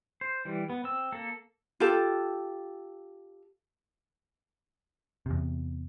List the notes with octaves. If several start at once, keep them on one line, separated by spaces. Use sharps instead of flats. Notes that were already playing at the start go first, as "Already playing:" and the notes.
C5
E3 G3
B3
C4 E6
A#3 A4
F4 G4 A4
E2 C3